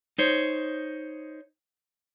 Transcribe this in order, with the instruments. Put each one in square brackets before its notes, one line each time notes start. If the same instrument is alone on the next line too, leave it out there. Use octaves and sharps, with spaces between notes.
[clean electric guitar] D#4 C5 C#5